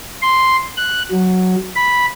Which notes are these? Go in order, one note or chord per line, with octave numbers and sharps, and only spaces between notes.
C6
F#6
F#3
B5